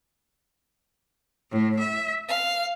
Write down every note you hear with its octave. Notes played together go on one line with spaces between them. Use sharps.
A2
E5
F5